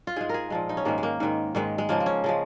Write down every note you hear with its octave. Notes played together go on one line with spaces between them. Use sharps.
F4
G#2 G#3 G#4
G#4 A#4
A#2 F3 G#3
D#4
C#4
G#2 D#3 G#3 A#3
G#3
A#3
G#2 D#3 G#3
G#2 D#3 G#3
G#3
C#3 F3 G#3 A#3
A#3
C#4
C#3 F3 G#3